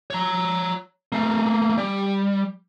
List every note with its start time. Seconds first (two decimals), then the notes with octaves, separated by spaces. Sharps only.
0.10 C#5 A#5
1.12 A3 A#3
1.77 G3